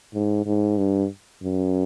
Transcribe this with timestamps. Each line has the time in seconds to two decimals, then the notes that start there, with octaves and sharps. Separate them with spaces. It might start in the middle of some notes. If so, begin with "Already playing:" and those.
0.14 G#2
0.46 G#2
0.77 G2
1.43 F#2